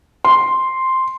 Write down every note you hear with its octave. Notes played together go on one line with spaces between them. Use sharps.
C6